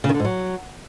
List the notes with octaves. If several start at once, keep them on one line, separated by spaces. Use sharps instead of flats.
C#3
D#3
D3
G#2
F#3